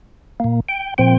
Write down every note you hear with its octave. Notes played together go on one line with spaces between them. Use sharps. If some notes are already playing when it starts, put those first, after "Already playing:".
A#2 A#3
G5
A#2 F3 C4 G5